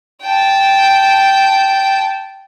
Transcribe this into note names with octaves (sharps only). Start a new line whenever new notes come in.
G5 A5